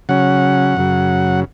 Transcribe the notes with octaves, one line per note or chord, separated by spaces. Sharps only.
C#3 F#3 C#4 F#5
F#2 C#3 F#3